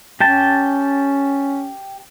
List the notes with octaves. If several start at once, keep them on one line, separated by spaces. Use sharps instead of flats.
C#4 G4 G5 A5